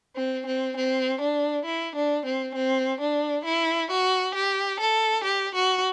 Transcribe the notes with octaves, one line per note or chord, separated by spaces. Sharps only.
C4
C4
C4
D4
E4
D4
C4
C4
D4
E4
F#4
G4
A4
G4
F#4